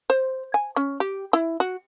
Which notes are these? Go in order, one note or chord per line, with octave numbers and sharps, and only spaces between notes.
C5
G#5
C#4
G4
E4
F#4